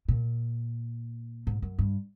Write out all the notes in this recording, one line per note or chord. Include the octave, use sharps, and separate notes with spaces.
A#2
G#2
F#2
G2